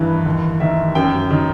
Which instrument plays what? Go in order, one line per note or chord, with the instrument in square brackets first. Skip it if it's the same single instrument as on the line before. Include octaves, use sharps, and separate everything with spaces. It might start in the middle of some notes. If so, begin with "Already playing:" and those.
Already playing: [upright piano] G2 D#3 E3 B4
D#2
D#3 E5
F#2 G5
D#3